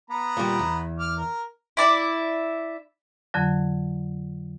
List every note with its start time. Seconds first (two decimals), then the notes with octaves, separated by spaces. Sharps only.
0.10 B3 A#5 B5
0.37 A#2 G3
0.59 E2
0.99 D6 F6
1.17 A#4
1.77 E4 D5 E5
3.34 F2 D3 F#3